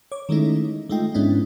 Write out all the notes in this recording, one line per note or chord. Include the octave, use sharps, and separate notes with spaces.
C#5 D6
D#3 G#3 A3 C#4 D#4 E4
G#3 A3 D#4 F4 G5
G#2 G#3 B3 C#4 D4 E4